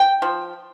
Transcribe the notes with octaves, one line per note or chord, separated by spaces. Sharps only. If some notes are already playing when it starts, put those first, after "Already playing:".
Already playing: G5
F3